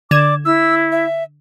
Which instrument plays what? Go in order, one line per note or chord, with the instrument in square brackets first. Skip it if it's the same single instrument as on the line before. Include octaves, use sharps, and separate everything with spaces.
[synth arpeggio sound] D3 G#6 E7 [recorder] D5 [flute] D6
[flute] E4 [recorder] E6
[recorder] E5